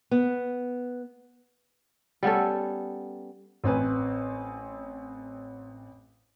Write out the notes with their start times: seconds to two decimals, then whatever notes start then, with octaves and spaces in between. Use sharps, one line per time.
0.11 B3
2.23 G3 B3 C#4 A4
3.64 A1 C4 B4 G#5